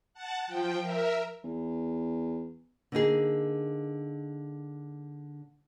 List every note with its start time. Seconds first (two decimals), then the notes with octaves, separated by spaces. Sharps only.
0.14 F#5 A5
0.47 F3 G5
0.81 A#4 E5
1.44 E2
2.92 D3 A#3 D#4 G#4